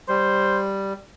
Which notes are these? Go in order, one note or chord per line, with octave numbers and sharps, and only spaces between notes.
G3 C5